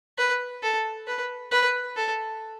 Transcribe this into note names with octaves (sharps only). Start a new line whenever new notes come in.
B4
A4
B4
B4
A4